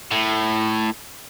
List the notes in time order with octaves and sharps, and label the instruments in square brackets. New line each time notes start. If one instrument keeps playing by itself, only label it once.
[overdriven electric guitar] A2